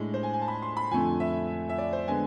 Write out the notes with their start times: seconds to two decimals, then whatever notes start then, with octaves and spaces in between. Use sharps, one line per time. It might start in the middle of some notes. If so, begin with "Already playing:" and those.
Already playing: A2 G#3 D4
0.14 C5
0.23 G#5
0.33 G#5
0.42 A5
0.48 B5
0.62 C6
0.77 B5
0.91 F2 D3 A3 C4 G#5
1.20 E5
1.69 E5
1.78 D5
1.93 C5
2.08 D3 G#3 B3 G#5